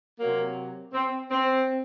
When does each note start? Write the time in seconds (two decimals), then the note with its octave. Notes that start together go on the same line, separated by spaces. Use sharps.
0.20 C3 F#3 A#3
0.93 C4
1.30 C4